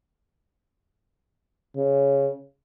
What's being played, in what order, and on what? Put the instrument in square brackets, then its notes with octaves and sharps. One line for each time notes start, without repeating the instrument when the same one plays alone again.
[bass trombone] C#3